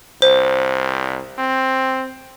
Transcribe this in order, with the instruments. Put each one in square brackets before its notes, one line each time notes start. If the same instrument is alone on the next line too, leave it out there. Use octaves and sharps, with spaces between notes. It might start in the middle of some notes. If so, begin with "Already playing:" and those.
[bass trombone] C2 [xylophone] C5
[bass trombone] C4